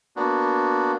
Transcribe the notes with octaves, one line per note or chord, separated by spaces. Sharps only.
A#3 B3 D4 F#4